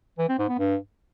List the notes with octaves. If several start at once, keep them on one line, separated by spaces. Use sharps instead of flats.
E3
C4
G#2
B3
G2